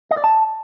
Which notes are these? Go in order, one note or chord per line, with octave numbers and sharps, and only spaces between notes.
D#5
D5
A5